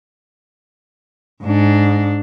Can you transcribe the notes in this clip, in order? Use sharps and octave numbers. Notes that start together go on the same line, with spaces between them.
G#2 D4